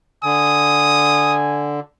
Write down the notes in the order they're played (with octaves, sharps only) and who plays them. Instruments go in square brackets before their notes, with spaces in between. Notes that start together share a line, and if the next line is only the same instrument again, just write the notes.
[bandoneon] D3 [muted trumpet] G#5 [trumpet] D#6